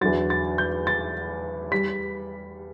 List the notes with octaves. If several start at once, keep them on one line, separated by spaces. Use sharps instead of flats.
E2 D3 F#3 A6
A6
G6
A6
G3 B6